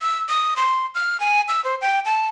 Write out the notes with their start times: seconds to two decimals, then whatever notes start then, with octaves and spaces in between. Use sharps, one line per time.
0.01 E6
0.29 D#6
0.56 C6
0.95 F6
1.20 G#5
1.48 E6
1.64 C5
1.81 G5
2.05 A5